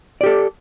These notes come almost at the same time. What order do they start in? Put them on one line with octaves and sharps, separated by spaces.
D5 G4 A4